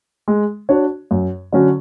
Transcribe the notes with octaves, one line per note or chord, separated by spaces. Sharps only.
G#3
D4 F#4 C#5
F#2
D3 F#3 C#4 F#4